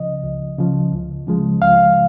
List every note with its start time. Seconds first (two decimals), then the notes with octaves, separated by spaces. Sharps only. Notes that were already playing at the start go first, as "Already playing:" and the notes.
Already playing: C#2 C#3 F3 D#5
0.24 C#2
0.58 C#3 F3
0.93 C#2
1.27 C#3 F3 G#3
1.62 C#2 F5